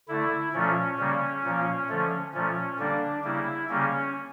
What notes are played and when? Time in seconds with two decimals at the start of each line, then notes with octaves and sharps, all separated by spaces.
0.08 D3 A3 E4
0.54 A#2 F3 A3 C#4
0.99 C#3 G3 A#3
1.44 A#2 F3 A#3
1.89 D3 F3 A3
2.34 A#2 F3 A3 C#4
2.79 D3 G3 A#3 D4
3.24 C#3 G3 A#3 E4
3.69 C#3 G3 A#3 C#4